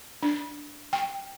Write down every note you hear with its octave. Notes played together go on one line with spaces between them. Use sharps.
D4
G5